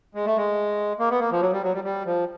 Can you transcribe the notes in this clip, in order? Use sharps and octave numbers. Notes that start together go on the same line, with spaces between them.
G#3
A3
G#3
A#3
B3
A#3
F3
F#3
G3
F#3
G3
G3
F3